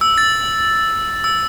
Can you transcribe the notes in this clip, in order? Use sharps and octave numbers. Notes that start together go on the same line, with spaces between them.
E6
A6
E6